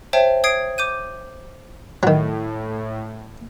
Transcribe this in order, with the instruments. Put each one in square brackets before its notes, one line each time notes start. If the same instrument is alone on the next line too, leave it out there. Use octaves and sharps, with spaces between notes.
[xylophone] C5 C#5 E5 G5 A5
D#6 G#6 C7 D7
D6 G6 D#7
[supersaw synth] A2 [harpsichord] D#3 F#3